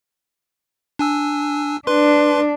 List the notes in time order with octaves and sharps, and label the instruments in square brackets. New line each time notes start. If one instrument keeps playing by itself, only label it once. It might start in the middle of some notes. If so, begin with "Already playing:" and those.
[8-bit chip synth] D4 G#5 E6
[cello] D4 [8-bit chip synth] B4 C6